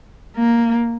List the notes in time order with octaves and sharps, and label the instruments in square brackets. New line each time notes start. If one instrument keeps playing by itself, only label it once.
[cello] A#3